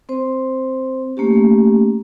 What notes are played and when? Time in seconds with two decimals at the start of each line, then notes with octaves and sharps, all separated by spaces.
0.09 C4 C5
1.17 A3 A#3 C#4 G4